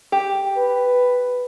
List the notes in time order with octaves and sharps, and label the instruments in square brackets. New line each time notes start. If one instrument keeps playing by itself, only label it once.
[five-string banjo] G4
[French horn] B4